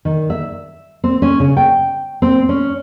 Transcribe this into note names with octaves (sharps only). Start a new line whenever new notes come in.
D#3
E5
C4
C#4
C#3
G5
C4
C#4